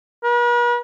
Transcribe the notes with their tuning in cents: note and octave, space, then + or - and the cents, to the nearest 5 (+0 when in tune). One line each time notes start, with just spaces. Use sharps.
B4 -45